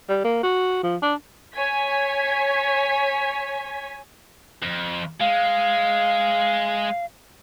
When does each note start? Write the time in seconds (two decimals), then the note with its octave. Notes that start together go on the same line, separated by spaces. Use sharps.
0.09 G3
0.24 A#3
0.43 F#4
0.83 F3
1.02 D4
1.55 C#5 G#5 G#6 B6
4.62 F2
5.20 G#3 F5